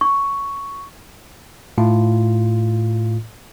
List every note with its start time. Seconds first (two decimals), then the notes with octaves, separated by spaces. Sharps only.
0.01 C#6
1.78 A2 F4